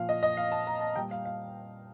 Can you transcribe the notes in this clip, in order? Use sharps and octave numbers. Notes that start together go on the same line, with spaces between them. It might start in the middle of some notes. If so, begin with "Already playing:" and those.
Already playing: A#2 F3 F5
D#5
D#5
F5
A5
A#5
A5
A#2 G3 G5
F5
F5